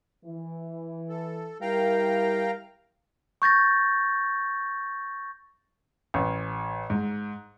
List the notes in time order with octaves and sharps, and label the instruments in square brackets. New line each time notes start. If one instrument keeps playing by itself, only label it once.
[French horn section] E3
[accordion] A4
[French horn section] G3 E4 A#4 [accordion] F5 G5 A#5
[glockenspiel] C#6 G6 A6 A#6
[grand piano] A1
G#2